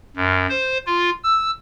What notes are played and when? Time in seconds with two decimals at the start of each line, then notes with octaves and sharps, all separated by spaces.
0.16 F#2
0.49 C5
0.87 F4
1.23 E6